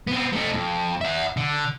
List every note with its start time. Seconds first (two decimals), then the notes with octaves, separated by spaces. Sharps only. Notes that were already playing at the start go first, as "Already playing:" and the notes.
0.07 B3 C4
0.33 A3 D#4
0.54 F2
1.01 E5 F#5
1.37 D3